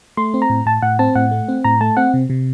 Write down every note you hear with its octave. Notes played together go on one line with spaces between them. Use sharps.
A3 C6
C4
A#5
A2
A2 A5
A2 F#5
C4 A5
A2 F#5
A3
C4
A2 A#5
A3 A5
C4 F#5
C3
C3